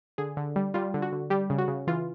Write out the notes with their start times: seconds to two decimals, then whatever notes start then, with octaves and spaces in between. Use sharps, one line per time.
0.18 D3 G#4
0.37 D3
0.56 G3
0.74 G3 F4
0.94 D3
1.02 F#4
1.12 D3
1.30 G3 G4
1.50 C#3
1.58 F#4
1.68 C#3
1.87 E3 F4